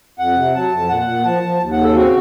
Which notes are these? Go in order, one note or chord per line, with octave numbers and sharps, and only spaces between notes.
F2 F#5
C3
F#3 A5
F2
A#2 F#5
A#2
F3 A5
F3
D#2
F#5
C#3
A4
C4 F#4